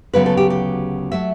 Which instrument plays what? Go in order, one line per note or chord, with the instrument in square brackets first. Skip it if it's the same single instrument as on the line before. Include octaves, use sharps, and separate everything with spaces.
[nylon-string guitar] D2 C#3 F#3 B3 B4
A4
G4
G4
F#3 A3 E5